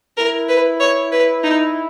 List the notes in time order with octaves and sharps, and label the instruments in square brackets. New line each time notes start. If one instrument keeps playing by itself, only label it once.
[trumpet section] E4 [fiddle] A#4
[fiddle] B4
C#5
B4
D#4